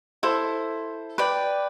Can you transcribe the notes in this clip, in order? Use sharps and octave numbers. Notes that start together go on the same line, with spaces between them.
E4 A4 C5
B4 D5 G5